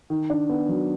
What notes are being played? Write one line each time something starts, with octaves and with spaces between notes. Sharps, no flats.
D#3
D4
B3
F#3